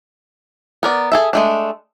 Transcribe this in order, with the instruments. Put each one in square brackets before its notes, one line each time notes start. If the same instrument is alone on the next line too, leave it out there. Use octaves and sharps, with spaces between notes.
[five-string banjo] B3 A#4 D5
G#4 A4 E5
G#3 A3 D4